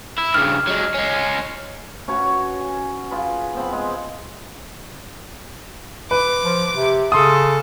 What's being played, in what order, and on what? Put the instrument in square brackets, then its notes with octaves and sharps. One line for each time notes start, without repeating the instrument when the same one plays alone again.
[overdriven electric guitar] E4
[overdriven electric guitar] G2 C#3 [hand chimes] F6
[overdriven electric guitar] F#3 G#3
G#3 C#4
[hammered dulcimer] C#4 F#4 B4 C#5
G#5
F4 G#4 B4
B3 C4 B5
G#3
[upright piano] B4 [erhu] D6
[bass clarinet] F3
C3
[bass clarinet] C#3 [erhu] A4 [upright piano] C6 D#6